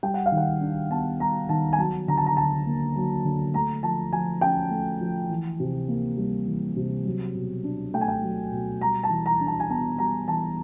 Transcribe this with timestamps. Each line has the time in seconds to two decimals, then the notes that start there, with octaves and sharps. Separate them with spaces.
0.03 G3 G5
0.14 F#5
0.26 F5
0.32 D#3
0.37 F#5
0.61 D4
0.90 B3 A5
1.20 G3 A#5
1.49 D#3 A5
1.73 G#5
1.78 F#3 A5
2.08 D3 A#5
2.17 A5
2.26 A#5
2.37 D3 A5
2.66 A#3
2.96 F#3
3.24 D3
3.54 A3 A#5
3.83 F3 A5
4.13 F3 G#5
4.41 C#4 G5
4.71 A3
5.01 F3
5.29 E3
5.60 C3
5.89 A#3
6.18 G3
6.47 E3
6.76 C3
7.05 F#3
7.35 B2
7.64 D4
7.94 A3 G5
8.01 G#5
8.08 G5
8.23 F#3
8.52 B2
8.81 G3 A#5
9.03 A5
9.10 E3
9.26 A#5
9.40 D4
9.47 A5
9.60 G#5
9.70 B3 A5
9.99 G3 A#5
10.28 E3 A5